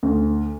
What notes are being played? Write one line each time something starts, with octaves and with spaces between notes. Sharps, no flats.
D2